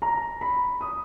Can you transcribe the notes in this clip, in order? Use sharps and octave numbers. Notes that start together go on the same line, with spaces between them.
A#5
B5
D#6